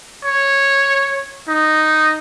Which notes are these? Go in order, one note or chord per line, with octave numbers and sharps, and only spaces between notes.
C#5
D#4